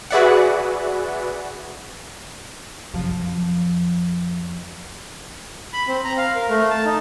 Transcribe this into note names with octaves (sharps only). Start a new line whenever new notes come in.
F#4 G#4 B4 D5 E5 F#5
F2 F3
B5
C4
A#5
F5
A#4
A3
A5
D#4